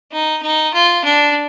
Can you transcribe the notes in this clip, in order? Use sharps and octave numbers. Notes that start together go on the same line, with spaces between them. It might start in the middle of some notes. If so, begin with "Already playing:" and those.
D#4
D#4
F4
D4